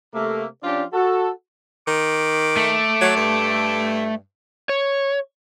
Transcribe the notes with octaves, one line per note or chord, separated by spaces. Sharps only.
C3 A3 A#3
F3 C#4 D4 F4 G4 D5
F#4 A4
D#3 D6
A3
F#3
G2
C#5